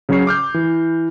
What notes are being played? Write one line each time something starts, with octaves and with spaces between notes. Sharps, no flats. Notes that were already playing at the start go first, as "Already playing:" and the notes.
C#3 F#3 C#4 F#4 C#5 C7
D6 F6 G6
E3